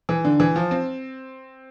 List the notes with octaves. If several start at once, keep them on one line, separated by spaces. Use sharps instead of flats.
E3
D3
E3
F3
C4